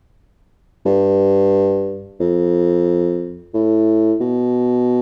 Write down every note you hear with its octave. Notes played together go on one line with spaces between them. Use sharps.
G2
F2
A2
B2